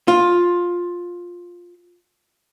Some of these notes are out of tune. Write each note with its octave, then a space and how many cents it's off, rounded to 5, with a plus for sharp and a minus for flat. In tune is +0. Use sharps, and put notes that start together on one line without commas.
F4 +10